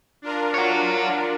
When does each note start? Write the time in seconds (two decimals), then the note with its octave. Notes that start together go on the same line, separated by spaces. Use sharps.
0.22 D4 F4 A#4
0.54 C#5 F#5